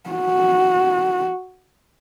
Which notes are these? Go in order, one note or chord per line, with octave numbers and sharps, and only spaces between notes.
F#4